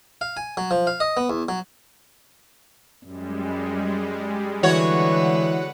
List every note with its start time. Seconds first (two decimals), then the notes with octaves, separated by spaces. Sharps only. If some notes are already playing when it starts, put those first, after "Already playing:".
0.21 F5
0.37 G#5
0.57 F#3
0.71 F3
0.87 F5
1.00 D#5
1.17 B3
1.30 E2
1.49 F#3
3.06 F#2 G3 G#3
4.63 D3 E3 G#3 F#4 B4 C#5 F#5